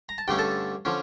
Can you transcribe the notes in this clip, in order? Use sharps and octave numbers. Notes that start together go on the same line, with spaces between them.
A#5
A5
G2 D3 A3 C#4 G5
A4 A5
D3 F3 C#4